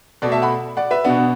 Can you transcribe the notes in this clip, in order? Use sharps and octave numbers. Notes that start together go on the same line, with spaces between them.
B2 A3 A4 D5
E5 A5
F#5 B5
D5 F#5
B4 E5
B2 B3 D4 F#4